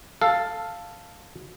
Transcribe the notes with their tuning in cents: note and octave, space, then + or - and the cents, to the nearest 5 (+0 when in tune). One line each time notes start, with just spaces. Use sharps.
A4 +5 F5 +0